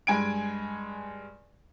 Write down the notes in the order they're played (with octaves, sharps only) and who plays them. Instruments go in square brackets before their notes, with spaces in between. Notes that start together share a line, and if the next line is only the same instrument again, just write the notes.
[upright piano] G2 G#3 G#5 G#6 D7